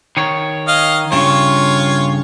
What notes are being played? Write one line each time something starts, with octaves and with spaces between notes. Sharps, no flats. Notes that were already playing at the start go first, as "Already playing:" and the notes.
D#3 C#5
D#5 F5
G2 C#3 F4 C#5